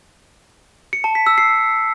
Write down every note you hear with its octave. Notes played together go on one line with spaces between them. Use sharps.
C#7
A5
B6
E6
C7